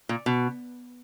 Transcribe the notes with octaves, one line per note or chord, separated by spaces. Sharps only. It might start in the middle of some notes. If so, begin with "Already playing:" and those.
A#2
B2